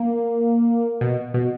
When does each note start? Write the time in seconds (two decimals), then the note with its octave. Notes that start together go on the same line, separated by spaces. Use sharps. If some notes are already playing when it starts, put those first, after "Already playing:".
Already playing: A#3
1.01 B2
1.34 B2